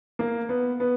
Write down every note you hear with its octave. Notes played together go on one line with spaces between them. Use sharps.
A#3
B3
B3